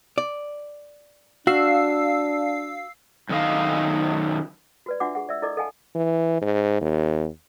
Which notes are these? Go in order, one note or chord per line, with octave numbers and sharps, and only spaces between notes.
D5
D4 F#4 F5 E6 C7
F#2 D#3 A3 D#5 F5
F#4 B4 D5
D4 F4 F#4 E5 F#5 D6
G#4 F#5
D5 E5 E6
E4 A4 D5 D#5 D6
A4 D#5 F5 F#5 G#5 A5
E3
G#2
D#2